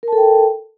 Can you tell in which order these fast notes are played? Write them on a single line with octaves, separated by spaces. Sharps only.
A#4 A5 A4 G5